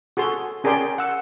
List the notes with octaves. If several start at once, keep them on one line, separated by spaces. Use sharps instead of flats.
F#4 G#4 A4 C6
C#4 G#4 A#4 D5 G5 C6
F#5 E6